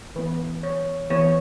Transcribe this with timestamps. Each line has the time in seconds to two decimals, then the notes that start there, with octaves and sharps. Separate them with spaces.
0.16 E3 B3 B4
0.63 C#5
1.10 E3 B3 C#5